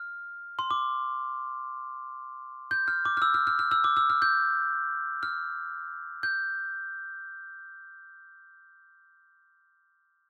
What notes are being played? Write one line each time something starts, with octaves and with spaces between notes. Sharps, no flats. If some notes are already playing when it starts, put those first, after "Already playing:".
Already playing: F6
C6
D6
G6
F6
D6
F6
E6
F6
F6
F6
E6
D6
E6
F6
G6
F6
G6